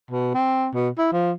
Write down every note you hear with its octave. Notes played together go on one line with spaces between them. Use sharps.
B2
C4
B2
E4
F3